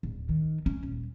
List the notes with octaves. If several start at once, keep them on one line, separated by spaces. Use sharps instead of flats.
D1
D#3
C#4
D#1